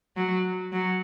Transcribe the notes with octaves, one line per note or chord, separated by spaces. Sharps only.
F#3
F#3